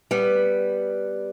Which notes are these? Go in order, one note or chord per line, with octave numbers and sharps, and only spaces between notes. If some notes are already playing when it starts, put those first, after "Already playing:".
G3 B3